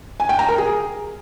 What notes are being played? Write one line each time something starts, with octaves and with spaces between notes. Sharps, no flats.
G#5
G5
A#5
A#4
G#4